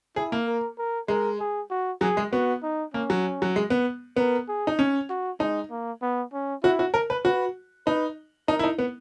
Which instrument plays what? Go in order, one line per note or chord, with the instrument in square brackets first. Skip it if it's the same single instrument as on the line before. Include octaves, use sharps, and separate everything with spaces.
[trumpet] E4 [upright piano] G#4
[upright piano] A#3
[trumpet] A#4
A#4
[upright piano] G#3 [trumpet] A#4
[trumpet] G#4
F#4
[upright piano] F#3 [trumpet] G#4
[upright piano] G#3
[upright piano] B3 [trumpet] F#4
[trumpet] D#4
[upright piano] A#3 [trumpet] C#4
[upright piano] F#3
F#3
G#3
B3
[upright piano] B3 [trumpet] A#4
[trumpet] G#4
[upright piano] D#4
C#4
[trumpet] F#4
[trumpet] G#3 [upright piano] D#4
[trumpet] A#3
B3
C#4
[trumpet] E4 [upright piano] F#4
[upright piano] F#4
A#4
B4
[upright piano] F#4 [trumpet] B4
[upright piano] D#4 [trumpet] B4
[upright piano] D#4 [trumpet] A#4
[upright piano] E4
D#4
B3